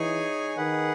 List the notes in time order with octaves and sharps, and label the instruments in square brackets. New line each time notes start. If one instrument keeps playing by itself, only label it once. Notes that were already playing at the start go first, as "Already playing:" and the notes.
Already playing: [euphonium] E3 [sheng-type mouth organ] D#4 G#4 C#5 G#5
[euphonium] D#3 [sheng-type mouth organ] G#4 B4 F#5